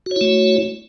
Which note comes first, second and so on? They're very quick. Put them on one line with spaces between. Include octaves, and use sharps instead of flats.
F#4 C#5 E4 A3